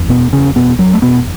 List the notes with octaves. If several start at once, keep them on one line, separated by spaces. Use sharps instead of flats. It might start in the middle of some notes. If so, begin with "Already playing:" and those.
Already playing: F#1 E2
B2 B3
C#3 C#4
B2 B3
F#3
A3
B2 B3